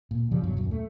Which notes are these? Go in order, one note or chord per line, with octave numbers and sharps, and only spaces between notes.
A#2
C#3 F3 G3
F1 G2 B2 F#3
D#1 F#2
A3